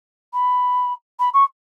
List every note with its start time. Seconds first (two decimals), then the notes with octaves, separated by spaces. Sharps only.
0.33 B5
1.19 B5
1.34 C#6